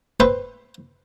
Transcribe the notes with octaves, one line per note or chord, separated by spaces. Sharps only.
B4 C5 E5 G5 C6